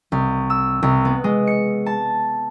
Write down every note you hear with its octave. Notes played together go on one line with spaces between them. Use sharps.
C2
E6
C2
B3
G#3
C#7
A5